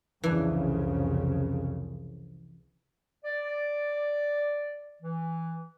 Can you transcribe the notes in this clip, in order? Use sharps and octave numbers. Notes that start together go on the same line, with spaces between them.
C2 F2 C#3 E3 D4
D5
E3